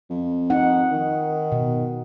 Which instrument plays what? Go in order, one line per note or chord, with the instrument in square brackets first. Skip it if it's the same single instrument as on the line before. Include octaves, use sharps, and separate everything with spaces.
[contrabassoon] F2
[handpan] D#4 F#5
[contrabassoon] D#3
[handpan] B2